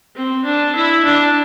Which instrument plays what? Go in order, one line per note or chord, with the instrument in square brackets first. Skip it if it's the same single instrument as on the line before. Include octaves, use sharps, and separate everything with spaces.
[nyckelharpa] C4
D4
E4
D4